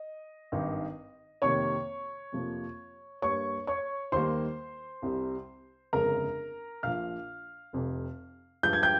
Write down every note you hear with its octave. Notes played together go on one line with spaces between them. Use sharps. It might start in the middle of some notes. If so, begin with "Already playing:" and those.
Already playing: D#5
G#1 G2 D#3
F2 C3 D#3 A#3 C#5 C#6
F2 C3 F3 A#3
G2 G3 A#3 C#5 C#6
C#5 C#6
D#2 D#3 G3 A#3 C5 C6
C2 C3 G3
G1 F2 C#3 G#3 A#4 A#5
A#1 A#2 F3 F5 F6
F1 F2 C3
G2 F3 G#3 G6
G#6
G5 G6